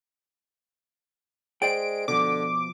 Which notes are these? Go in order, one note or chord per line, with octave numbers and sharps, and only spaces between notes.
G#3 C5 D5 G5 D7
B2 D3 F3 D6